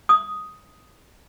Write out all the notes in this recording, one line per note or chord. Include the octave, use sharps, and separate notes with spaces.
D#6